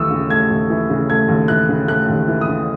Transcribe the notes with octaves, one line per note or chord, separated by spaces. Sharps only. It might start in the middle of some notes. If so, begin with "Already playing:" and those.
Already playing: D#2 E3 A3 C#6 D#6 E6
C#3
A3 G#6
D#2
E3
C#3
A3 G#6
D#2
E3 F#6
C#3
A3 F#6
D#2
E3
D#6
C#3